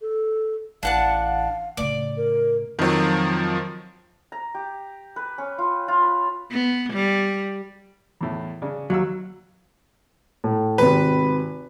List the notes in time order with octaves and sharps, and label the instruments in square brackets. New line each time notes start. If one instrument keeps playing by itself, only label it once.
[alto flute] A4
[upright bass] A1 [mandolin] D4 F#5 A5 [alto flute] F5
[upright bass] A2 C#3 [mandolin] D5
[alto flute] A#4
[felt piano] F2 F#3 [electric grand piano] D#3 F3
[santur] A#5
G4
B4
C#4
F4
F4
B5
[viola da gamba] B3
G3
[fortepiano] E2 A2
C#3 D4
[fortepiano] D#2 F5 E6 [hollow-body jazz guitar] F#3
[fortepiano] A2
[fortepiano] G#1 C3 [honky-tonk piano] B4